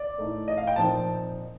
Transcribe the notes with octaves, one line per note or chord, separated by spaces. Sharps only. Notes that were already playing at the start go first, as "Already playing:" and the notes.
Already playing: D5
A2 A3 D#4
D#5
F5
G5
A#2 F3 C4 D#4 A5